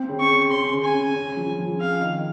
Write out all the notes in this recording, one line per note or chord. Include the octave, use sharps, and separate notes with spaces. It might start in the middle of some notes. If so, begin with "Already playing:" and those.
Already playing: C4
C#3
C#6
C#3
C#4 C6
C#3
G#5
C#3
C#4
F3
F3
C4 F5
D#3